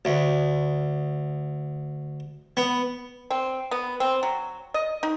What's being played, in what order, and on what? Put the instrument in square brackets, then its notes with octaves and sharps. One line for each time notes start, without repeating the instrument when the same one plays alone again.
[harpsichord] D2
B3
[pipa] C4
B3
C4
F#3
D#5
D#4